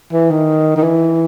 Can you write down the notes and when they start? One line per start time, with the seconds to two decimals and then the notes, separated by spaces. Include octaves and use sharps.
0.12 E3
0.31 D#3
0.77 D#3
0.83 E3